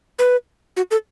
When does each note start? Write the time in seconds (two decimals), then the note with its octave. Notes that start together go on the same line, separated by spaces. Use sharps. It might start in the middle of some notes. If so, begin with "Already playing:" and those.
0.19 B4
0.77 F#4
0.91 A4